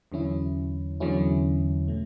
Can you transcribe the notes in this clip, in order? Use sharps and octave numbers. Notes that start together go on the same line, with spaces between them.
E2 D3 F#3 C#4 E4
E2 D3 F#3 C#4 E4
B2 A3